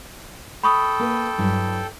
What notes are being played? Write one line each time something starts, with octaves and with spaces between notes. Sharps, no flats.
A4 G5 B5 C#6 D#6
A#3 B4
G2 F#3 E4